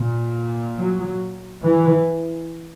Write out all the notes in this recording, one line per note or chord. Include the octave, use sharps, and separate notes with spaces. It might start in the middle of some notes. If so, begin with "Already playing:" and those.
Already playing: A#2
F#3
E3